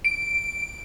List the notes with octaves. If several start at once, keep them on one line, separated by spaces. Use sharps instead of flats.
D7